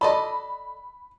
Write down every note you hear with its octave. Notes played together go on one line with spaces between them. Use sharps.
A4 D5 D#5 B5